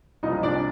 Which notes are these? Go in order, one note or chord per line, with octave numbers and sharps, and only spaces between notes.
C2 A#2 F3 D#4 D#5
D4 D5